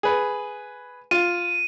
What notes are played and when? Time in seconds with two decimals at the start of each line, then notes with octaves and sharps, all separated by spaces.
0.03 G#4 B4
1.11 F4 D#7